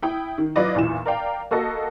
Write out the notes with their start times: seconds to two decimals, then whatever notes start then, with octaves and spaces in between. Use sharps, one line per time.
0.02 E4 G5 D#6
0.38 D#3
0.56 F#3 E4 F4 B4 D5 D#5
0.75 B1 E2 A#2 E3 E7
1.06 A#4 D5 F5 G5
1.51 A#3 F#4 A4 D#5 A5